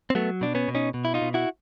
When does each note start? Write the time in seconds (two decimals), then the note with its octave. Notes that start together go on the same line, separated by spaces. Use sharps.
0.10 C4
0.15 F#3 A3 B3
0.41 B2 D4
0.55 B3 C#4
0.68 B2
0.75 C#4 D#4
0.94 B2
1.05 E4
1.14 D#4 F4
1.22 B2
1.34 E4 F#4